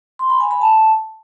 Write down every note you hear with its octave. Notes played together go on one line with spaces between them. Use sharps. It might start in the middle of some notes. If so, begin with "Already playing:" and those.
C6
B5
G#5
B5
A5